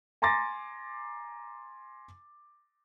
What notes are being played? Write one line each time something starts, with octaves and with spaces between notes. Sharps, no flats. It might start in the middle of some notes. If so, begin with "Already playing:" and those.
G#5 A#5 C6 D6 A6 A#6